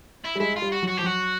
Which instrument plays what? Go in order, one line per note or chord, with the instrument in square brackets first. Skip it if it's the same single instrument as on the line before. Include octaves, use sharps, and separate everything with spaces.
[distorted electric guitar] E4
[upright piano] G3
[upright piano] G#3 [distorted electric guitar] E4
[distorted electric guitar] F4
[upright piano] G3
[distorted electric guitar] F#4
[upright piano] F#3 [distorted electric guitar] F#4
[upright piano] F3 [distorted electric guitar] G4
[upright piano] F#3 [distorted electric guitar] F#4